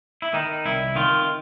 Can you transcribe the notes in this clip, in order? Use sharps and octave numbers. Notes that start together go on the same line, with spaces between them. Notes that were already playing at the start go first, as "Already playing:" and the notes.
E4
D#3 D#4
C2 E4
D#3 F4